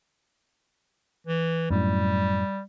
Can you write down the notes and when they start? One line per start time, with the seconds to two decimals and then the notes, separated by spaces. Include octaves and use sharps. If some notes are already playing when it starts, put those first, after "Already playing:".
1.27 E3
1.70 F#2 A2 G3